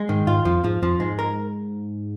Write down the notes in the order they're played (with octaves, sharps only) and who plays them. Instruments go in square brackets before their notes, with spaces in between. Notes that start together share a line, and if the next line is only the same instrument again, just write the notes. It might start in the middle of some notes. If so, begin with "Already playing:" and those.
Already playing: [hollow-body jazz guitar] G#3
[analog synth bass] G#2 [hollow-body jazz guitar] D#3
[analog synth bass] G#2 [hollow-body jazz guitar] F4
[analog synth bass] F2 [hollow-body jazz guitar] F3
[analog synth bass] G#2 [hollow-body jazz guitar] F3
[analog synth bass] F2 [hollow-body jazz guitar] F3
[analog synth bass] G#2 [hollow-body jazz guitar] G#3
[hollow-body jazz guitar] A#4